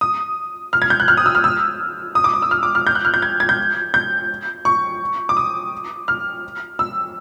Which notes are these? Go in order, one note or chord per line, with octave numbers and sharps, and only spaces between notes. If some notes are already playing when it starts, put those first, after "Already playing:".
D#6
F6
G#6
G6
F#6
F6
D#6
E6
F6
E6
D#6
D6
D#6
E6
F6
D6
F6
G6
F#6
F6
G6
G#6
G#6
G6
G6
C#6
D6
D#6
F6
E6